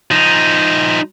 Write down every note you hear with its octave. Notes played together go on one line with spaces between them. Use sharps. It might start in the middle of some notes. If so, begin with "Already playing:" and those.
F3 D#4